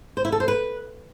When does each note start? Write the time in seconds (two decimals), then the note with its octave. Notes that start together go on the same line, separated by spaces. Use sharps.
0.17 C5
0.25 E4
0.32 A4
0.40 C5
0.48 B4